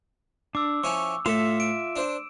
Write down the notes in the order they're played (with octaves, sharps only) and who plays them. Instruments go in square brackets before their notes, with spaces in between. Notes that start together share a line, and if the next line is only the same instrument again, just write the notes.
[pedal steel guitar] D4 [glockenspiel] D6 E6
[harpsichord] F3 C#4 E4 [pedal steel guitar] C#6
[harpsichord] A2 A4 [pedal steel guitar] F4 E5 [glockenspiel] E7
[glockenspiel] D7
[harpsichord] D4 C5